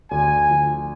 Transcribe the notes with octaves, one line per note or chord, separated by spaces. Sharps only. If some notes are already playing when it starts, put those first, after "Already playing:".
D2 G#5
D3 F3